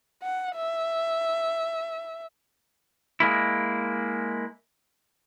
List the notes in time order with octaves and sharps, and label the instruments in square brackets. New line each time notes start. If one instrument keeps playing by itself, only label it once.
[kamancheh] F#5
E5
[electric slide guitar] G#3 A#3 E4